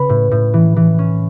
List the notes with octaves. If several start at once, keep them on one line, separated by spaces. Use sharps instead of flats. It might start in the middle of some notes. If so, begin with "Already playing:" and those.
Already playing: C#3 B4
A2
A2
E3
E3
C#4